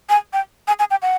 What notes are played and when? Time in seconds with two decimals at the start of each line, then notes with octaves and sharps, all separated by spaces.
0.10 G#5
0.33 G5
0.68 G#5
0.79 G#5
0.91 G5
1.02 F#5